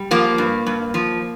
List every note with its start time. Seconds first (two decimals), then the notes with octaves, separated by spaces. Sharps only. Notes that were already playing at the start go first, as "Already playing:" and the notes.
Already playing: G3
0.11 F3 A#3
0.38 G2
0.66 G2
0.94 F3